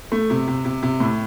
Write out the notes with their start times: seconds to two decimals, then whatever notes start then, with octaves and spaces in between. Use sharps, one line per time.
0.12 A3
0.30 C3
0.48 C3
0.65 C3
0.83 C3
1.00 A2